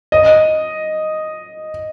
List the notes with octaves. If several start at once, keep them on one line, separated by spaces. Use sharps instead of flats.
D#5